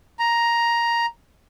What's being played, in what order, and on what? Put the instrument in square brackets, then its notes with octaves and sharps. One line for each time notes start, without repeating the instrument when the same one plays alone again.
[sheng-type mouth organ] A#5